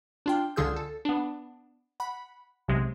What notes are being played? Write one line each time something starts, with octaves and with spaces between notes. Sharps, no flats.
D4 F4 G5
C#2 D3 F4 G#4 E6 G6
A4
B3 D4
F#5 B5
B1 C3 G#3